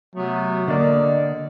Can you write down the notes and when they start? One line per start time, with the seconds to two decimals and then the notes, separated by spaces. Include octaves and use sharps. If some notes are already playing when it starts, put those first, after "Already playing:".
0.15 C3 F#3 A3 B3
0.68 D3 A#3 D5 D#5